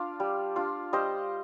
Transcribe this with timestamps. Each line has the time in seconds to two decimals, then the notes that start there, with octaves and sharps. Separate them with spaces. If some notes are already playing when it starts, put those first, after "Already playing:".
Already playing: D4 F4 F5
0.20 G3
0.56 D4 F4
0.93 G3 C5 D#5